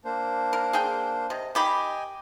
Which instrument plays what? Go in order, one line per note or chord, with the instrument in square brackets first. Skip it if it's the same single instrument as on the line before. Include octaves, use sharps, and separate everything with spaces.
[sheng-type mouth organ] A#3 D4 C5
[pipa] A#4
G#4 A#4 G5
[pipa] C3 [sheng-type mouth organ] D#5
[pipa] D#3 G4 B5 [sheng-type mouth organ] D#5 G5 G#5